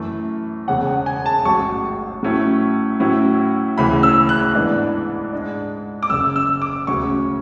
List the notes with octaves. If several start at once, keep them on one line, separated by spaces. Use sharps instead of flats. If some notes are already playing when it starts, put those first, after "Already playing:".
Already playing: F#2 E3 A3
E1 E2 C#3 F#5
F#5
G#5
A5
A1 G#2 F#3 C#6
A2 F#3 A3 C#4 E4
A2 F#3 C#4 E4
E1 D2 C#3 E3 B5
E6
F#6
G#2 E3 B3 D4
G#2 G#3 D4
D6
F#1 F#2 C#3 E6
E6
D6
E1 D2 C#3 F#3 C#4 C#6